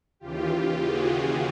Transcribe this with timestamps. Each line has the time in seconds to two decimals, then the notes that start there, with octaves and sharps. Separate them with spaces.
0.20 D#2 C#3 E3 F4 G4
0.78 F#4 G#4
1.06 F#4 G#4